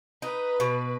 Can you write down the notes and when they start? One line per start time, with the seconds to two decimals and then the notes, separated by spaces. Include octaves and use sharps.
0.22 D#4 B4
0.60 B2